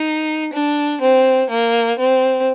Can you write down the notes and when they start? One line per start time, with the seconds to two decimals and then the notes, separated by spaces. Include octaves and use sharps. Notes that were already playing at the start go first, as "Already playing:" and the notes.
Already playing: D#4
0.53 D4
1.01 C4
1.50 A#3
1.99 C4